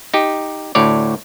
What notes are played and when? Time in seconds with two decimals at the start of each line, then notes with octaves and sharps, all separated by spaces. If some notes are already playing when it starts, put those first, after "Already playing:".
0.14 D#4 G4
0.75 D2 A2 C#5 D5